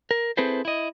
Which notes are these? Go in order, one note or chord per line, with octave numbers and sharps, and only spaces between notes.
A#4
C4 E4 G#4 A4 B4 C5
E4 D#5